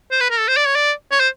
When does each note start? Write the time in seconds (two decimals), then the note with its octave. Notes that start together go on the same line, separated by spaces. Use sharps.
0.11 C5
0.20 B4
0.30 A#4
0.39 A4
0.48 C5
0.57 D5
0.66 C#5
0.75 D5
1.11 C#5
1.20 C5